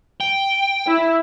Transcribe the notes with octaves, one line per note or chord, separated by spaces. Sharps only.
G5
E4